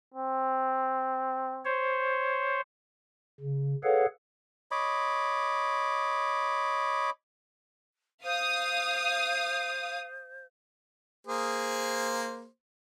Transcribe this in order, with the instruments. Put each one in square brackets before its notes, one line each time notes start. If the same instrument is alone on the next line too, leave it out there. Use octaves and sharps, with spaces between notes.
[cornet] C4
[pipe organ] C5 C#5
C#3
G#4 A4 B4 C#5 F5 F#5
[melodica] C#5 D#5 B5 D6
[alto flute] C5 [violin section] F5 D#6
[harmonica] A#3 G#4 C5